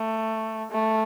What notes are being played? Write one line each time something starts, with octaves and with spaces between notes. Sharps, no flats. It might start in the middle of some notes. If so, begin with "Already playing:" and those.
Already playing: A3
A3